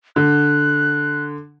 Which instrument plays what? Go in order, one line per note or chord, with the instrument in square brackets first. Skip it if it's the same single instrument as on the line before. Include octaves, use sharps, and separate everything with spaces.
[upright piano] D3 [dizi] F#6